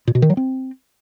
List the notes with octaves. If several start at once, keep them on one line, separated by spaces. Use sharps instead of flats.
A#2
B2
D#3
F#3
C4